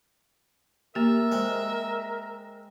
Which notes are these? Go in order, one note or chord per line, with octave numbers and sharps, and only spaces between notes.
A#3 G4 A#4 E5
G#3 C4